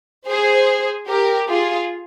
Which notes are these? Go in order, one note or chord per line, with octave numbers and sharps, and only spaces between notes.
G#4 C5
G4 A#4
F4 G#4